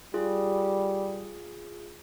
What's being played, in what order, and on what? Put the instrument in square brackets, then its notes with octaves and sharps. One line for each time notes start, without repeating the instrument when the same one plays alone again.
[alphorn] G3 [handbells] F4 G#4